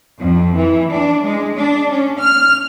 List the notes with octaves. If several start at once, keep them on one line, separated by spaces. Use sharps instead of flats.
F2
E3
D4
G#3
D4
C#4
F6